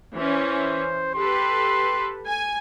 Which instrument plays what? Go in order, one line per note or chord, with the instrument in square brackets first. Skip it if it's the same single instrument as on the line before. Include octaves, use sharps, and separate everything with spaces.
[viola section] E3 C#4 [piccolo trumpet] C5
[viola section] G4 A4 B4 [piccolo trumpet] C6
[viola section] G#5